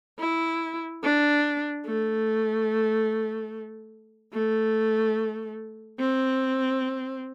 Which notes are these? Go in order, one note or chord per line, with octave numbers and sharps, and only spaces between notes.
E4
D4
A3
A3
C4